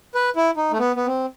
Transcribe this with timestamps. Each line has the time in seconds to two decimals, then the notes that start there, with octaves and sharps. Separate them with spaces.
0.15 B4
0.36 E4
0.57 D#4
0.71 A3
0.79 B3
0.96 B3
1.06 C4